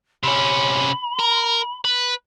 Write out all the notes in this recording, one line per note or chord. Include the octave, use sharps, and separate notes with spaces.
C3 C#4 B5
A#4
B4